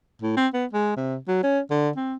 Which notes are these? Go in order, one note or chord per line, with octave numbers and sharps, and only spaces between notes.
A2
C4
B3
G#3
C3
F#3
C#4
D3
C4